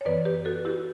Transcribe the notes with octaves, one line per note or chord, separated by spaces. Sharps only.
C#5
F#2 E3 B3 B4 D5
G4 B4
F#4 A4
E4 G4